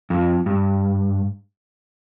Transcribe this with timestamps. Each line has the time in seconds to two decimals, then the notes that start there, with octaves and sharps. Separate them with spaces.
0.10 F2
0.46 G2